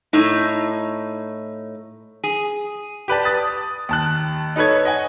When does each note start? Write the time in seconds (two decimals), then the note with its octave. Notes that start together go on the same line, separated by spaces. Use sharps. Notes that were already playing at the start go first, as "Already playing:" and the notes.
0.13 A2 D#4
2.24 G#4
3.08 G4 B4 D5 A5
3.25 D#6 A6
3.89 D#2 A5 F#6
4.56 D#4 A4 B4 C#5 G#6
4.85 D#5 F#5 G#5